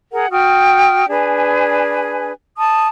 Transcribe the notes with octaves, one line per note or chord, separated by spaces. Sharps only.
G#4 A#4 F#5
F#4 G5 D#6 F6
D4 G#4 B4 G#5
A5 D#6